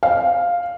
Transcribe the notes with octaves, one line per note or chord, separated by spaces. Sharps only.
F5